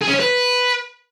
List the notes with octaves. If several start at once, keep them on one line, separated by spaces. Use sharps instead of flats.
G#4
C#4
C#5
B4